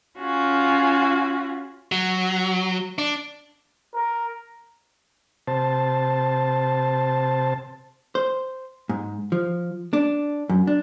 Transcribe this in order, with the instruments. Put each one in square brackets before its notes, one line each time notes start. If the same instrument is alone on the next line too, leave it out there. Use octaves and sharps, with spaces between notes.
[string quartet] C#4 F4 F#4 G#4
[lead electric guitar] F#3
D4
[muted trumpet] A#4
[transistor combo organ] C3 C5 A5
[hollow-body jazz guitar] C5
G#2
F3
D4
F#2
D4